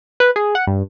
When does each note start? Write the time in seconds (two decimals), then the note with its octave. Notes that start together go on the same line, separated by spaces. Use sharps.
0.20 B4
0.36 G#4
0.55 F#5
0.67 G2